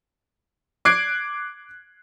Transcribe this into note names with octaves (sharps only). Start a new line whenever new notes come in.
D6 F#6 G#6 C7 D7